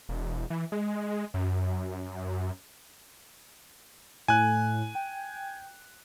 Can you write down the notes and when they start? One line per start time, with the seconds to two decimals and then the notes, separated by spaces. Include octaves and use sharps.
0.09 E1
0.50 E3
0.72 G#3
1.34 F#2
4.28 A2 G#5 F#6
4.95 G5